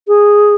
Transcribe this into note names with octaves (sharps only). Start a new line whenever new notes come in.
G#4